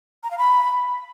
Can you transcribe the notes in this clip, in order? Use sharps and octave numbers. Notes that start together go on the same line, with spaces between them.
A#5
F5
B5